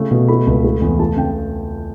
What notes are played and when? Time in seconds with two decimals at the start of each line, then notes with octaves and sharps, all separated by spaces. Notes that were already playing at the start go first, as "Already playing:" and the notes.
Already playing: C#3 A3
0.11 B2
0.28 A3 B5
0.47 C#2
0.64 A3
0.82 E2
0.99 A3 A5
1.17 C#3 G5